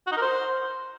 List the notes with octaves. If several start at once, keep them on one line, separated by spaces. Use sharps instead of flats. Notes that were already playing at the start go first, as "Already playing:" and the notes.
F#4
D#4
A#4
C5